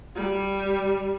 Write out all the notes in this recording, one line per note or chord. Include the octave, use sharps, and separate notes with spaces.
G3